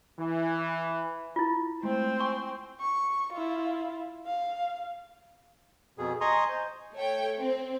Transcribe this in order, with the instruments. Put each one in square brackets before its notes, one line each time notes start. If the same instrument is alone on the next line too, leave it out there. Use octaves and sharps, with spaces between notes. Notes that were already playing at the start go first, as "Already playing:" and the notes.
[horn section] E3
[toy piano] E4 F4
[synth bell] G#3 A3 [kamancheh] C4 C5
[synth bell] G#5 [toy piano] C#6
[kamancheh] C#6
E4 F4
F5
[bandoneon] F2 B2 G#4
D#5 G#5 A#5 C6 C#6 D#6
C5
[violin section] A3 C#5 G5
C4